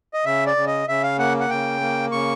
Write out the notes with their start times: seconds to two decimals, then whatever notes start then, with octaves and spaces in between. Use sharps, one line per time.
0.14 D#5
0.25 C#3 E5
0.46 D5
0.56 C#3
0.67 D#5
0.88 C#3 E5
1.03 F5
1.18 A#3 F#5
1.40 F#5
1.50 C#3 G5
1.81 A#3
2.12 C#3 C#6